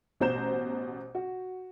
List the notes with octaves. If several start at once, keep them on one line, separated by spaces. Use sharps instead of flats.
A1 B2 C5 A#5 G6 E7
F#4